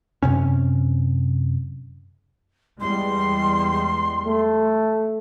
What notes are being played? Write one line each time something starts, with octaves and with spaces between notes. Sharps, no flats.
F#2 C3 C#4
E2 G3 G#3 C6
A3